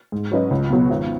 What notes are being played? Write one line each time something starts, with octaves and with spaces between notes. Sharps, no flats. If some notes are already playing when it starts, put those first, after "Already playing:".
G#2
F#3 C#4 B4 D#5
C#2
B2 F#3 B3
G#1